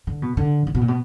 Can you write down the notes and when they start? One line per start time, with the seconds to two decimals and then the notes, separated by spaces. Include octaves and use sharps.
0.07 D3
0.22 B2
0.37 D3
0.67 D3
0.75 B2
0.81 A#2
0.88 B2